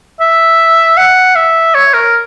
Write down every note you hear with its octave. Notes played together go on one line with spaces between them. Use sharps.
E5
F#5
E5
C#5
A#4